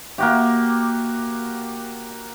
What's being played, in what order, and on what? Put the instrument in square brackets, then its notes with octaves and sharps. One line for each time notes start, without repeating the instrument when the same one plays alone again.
[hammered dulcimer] A#3 F#4 G4